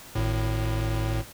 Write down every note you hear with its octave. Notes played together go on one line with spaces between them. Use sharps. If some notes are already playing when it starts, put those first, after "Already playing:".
G#1 A2